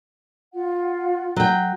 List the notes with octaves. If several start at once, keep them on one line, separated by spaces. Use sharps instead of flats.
F4 F#5
F#3 G5